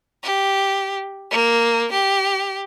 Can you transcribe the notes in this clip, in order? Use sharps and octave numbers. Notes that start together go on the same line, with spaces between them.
G4
A#3
G4